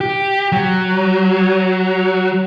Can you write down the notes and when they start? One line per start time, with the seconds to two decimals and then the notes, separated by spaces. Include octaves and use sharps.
0.01 G4
0.52 F#3